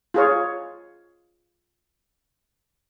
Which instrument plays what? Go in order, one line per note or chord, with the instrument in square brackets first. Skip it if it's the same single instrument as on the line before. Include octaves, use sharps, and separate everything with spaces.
[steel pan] F4 G#4 C#5